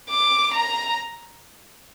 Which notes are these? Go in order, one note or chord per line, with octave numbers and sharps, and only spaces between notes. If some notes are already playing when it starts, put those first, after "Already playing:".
D6
A#5